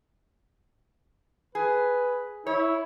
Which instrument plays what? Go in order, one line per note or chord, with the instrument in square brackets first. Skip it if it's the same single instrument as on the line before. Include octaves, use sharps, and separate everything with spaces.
[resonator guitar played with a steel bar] G#4 [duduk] B4
[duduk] E4 [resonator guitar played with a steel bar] C#5